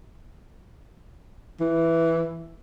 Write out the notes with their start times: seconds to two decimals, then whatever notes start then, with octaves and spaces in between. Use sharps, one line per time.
1.60 E3